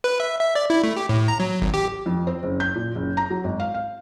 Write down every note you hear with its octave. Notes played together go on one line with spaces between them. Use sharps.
B4
E5
E5
D5
E4
A3
G4
A2
A#5
F#3
G#1
G4
F2
C4
F#1
G6
A#2
F#1
A#5
F#3
G#1
F5
F5